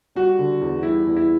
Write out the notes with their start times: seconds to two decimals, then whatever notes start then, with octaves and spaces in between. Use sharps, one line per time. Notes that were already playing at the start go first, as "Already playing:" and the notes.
0.15 G3 F#4
0.39 D3
0.61 E2
0.83 G3 E4
1.06 E2
1.16 E4